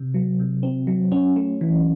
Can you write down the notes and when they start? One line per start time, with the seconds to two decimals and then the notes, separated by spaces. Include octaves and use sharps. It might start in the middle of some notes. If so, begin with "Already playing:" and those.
Already playing: C3
0.14 F#3
0.40 C3
0.63 C4
0.87 F#3
1.12 C#4
1.36 A3
1.61 E3